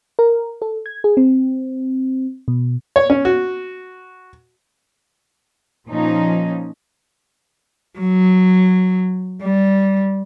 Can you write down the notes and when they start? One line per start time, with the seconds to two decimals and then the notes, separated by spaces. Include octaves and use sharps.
0.19 A#4
0.62 A4
0.86 G#6
1.04 G#4
1.17 C4
2.48 B2
2.96 C#5
3.10 C#4
3.25 F#4
5.88 A#2 F3 C#4 D#4
7.99 F#3
9.42 G3